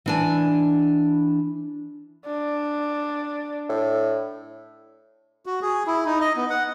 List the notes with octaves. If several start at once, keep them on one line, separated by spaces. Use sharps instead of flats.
E3 D4 G#5
D4
A2
F#4
G#4
E4
D#4
D#5
B3
F#5